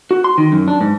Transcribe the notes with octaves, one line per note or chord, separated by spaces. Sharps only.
F#4
C6
D#3
F#2
D4
G#2